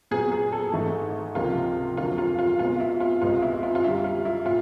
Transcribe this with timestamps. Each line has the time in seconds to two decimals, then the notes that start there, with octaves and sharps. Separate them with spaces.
0.11 A#2 F#3 B3 G#4
0.32 G#4
0.53 A4
0.73 G#2 E3 A3
1.35 C#2 C3 F3 A#3 F4
1.97 F2 D3 F#3 A#3 F4
2.18 F4
2.39 F4
2.59 B2 G#3 B3 F4
2.80 E4
3.00 F4
3.22 C2 B2 G#3 B3 F4
3.42 E4
3.63 F4
3.75 F4
3.84 F#2 D3 G3 E4
4.04 F4
4.25 E4
4.46 A2 F4